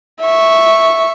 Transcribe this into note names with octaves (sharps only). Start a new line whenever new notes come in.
E5 C#6